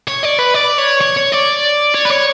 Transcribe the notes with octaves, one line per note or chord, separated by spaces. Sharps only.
C#5
D5
B4
D5
C#5
C#5
C#5
D5
C#5
B4
C#5